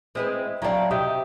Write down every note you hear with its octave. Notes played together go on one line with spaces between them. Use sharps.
G#3 C4 E4 B4
F#3 D4 E4 F5 G5 A#5
C3 G4 D#5 E5 D#6